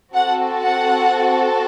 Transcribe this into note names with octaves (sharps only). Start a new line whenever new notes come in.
C4 F#4 A4 F#5
F#5